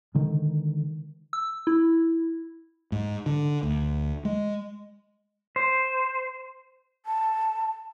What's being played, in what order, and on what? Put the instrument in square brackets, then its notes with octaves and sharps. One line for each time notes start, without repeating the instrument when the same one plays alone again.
[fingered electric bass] D3 D#3 G#3
[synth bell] E6
E4
[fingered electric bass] G#2
D3
D2
G#3
[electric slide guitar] C5
[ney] A5